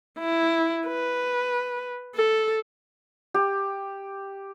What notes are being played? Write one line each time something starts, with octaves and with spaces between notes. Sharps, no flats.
E4
B4
A4
G4